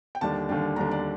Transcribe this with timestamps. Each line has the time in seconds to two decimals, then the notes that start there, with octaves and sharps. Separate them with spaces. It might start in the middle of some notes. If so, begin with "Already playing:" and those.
0.15 G5
0.21 D#2 D3 G3 D4 A5
0.49 D#2 D3 G3 D4
0.76 D#2 D3 G3 D4 A#5
0.91 D5